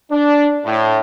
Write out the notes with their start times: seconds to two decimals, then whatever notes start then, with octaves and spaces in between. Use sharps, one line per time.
0.11 D4
0.65 A2